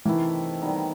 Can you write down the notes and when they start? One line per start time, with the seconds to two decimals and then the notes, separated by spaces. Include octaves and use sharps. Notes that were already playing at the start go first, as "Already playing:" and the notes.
0.05 C3 D#3 E3 A3 E4
0.62 D#3 G3 B3 D#4